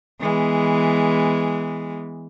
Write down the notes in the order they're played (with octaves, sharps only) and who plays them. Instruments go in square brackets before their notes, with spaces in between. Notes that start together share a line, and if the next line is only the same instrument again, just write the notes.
[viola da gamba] E3 G#3 B3